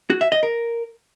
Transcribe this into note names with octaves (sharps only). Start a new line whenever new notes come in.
F#4
E5
D#5
A#4